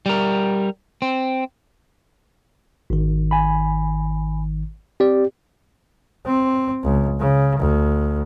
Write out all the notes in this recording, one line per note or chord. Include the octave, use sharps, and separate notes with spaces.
G3 A#4
C4
G#1 D#3
G#5 B5
C4 G4 D5
C4
C#2
C#3
D2